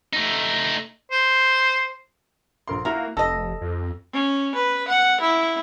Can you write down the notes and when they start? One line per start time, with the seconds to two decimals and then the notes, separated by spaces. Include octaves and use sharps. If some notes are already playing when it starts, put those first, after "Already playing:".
0.13 A3 D#4
1.12 C5
2.68 A#1 A#4 C6
2.85 A#3 E4 F#4 A#4 A#5
3.17 F1 A4 D#5 E6 A#6
3.61 F2
4.13 C#4
4.55 B4
4.88 F#5
5.21 E4